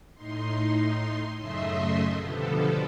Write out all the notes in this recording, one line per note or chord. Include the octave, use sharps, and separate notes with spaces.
A2 D#4 C6
F#2 C#3 A3 D#5 E5 C6
B2 D3 F3 G3 B3 A4